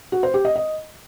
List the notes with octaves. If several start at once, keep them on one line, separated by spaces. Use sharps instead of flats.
F#4
C5
G4
D#5
D#5